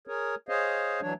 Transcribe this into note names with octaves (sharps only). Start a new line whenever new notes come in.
G#4 A#4 C#5
G#4 C5 C#5 D#5 F5
E3 F#3 D4 C#5